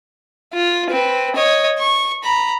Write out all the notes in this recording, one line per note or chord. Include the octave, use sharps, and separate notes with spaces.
F4
C4 B4
C#5 D#5
C#6
A#5 B5